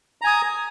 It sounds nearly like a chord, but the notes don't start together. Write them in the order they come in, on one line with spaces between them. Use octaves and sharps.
A#5 G#5 D#6